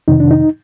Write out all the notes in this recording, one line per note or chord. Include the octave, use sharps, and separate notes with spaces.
F2 C3 D#3 D#4
D4
D#4